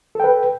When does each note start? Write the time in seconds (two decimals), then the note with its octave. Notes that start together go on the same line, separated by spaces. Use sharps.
0.15 A4
0.20 G5
0.24 B4